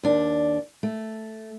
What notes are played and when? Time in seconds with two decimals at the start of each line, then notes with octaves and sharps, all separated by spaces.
0.03 D#2 D4
0.83 A3